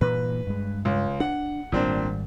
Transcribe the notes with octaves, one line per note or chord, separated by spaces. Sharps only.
G2 A#2 E3 B4
G2 G#3
C#2
D4 F#5
G#1 A#2 G3 C4 D4